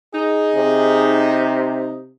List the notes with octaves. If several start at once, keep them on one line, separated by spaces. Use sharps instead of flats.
D#4 G#4
C3